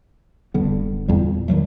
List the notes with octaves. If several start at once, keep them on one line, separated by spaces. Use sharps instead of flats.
D#1 G2 D3 B3
E2 A#2 G3
G2 D#3 F#3 A3